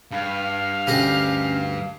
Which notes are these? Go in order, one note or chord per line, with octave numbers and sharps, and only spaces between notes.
G2 F5
D2 C#4 G4 D#5